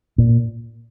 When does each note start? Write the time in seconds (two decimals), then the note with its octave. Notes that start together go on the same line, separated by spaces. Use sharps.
0.18 A#2